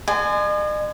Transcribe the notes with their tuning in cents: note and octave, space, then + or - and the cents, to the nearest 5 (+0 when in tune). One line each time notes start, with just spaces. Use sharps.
D#5 -45 G#5 +5 C6 -30